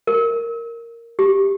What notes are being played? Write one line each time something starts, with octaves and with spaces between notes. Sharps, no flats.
A#4
G4